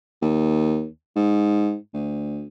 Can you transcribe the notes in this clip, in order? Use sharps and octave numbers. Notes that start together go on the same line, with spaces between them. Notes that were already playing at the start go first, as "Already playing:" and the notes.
D#2
G#2
D2